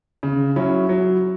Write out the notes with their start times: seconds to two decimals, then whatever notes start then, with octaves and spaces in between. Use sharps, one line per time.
0.23 C#3
0.56 F#3 C#4 E4
0.89 F#3